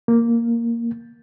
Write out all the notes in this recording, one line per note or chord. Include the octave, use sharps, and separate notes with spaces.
A#3